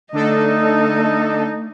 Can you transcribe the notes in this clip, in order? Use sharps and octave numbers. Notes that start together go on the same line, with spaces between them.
D3 A3 D4 D#4 A4 D#5